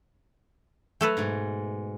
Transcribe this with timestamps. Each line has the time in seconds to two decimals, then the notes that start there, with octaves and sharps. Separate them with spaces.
1.01 F#3 A3 A4 B4 A#5
1.17 G#2 B2